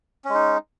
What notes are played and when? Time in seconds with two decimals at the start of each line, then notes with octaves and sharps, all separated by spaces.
0.25 C#4
0.30 G#3
0.34 D#4